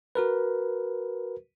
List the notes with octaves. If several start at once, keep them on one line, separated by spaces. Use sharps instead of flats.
F#4 A#4 B4